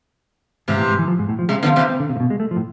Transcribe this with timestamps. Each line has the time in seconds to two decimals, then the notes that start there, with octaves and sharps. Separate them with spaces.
0.68 G#2 C3 E3
0.77 A2
0.89 G#2
0.99 E3
1.08 F3
1.19 G#2
1.29 A2
1.39 F3
1.49 C3 G#3
1.63 D3 F3 B3
1.76 C3 E3 C4
1.90 C4
2.00 D3
2.09 C3
2.16 A2
2.20 B2
2.30 G#3
2.40 A3
2.51 F3
2.56 A2